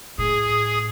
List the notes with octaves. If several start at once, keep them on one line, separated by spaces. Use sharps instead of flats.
A2 G#4